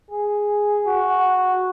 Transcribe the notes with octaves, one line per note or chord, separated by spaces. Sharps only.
G#4
F#4